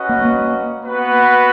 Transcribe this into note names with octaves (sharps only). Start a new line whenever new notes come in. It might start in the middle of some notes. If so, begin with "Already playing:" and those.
Already playing: C#4 F#4 B4 D#5 F#5
A#3
A#3
B3 F#4 B4